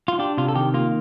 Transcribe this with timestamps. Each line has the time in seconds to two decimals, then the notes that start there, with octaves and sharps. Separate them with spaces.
0.08 F4
0.19 D4 G4
0.38 C3 F4
0.49 A4
0.55 D#3 G4
0.74 A#3 F4